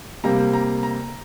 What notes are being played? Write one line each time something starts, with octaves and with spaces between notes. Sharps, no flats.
C3 G3 A#3 A#5
A#5
A#5